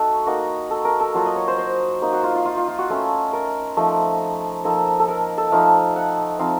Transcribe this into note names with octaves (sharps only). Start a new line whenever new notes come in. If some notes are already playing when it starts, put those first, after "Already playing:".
Already playing: A3 D#4 F#4 A4
A#3 D#4 F#4
A4
A#4
A4
F#3 A#3 F4 F#4
D#5
C#5
C5
C5
A#3 D#4
F#4
F4
F4
F4
F4
F4
F#4
A3 C#4 F4 A4
A#4
F3 A3 D#4
F3 A#3 D#4 A4
A4
A#4
A4
F3 A3 D#4 F5
F#5
F3 C4 D#4 F5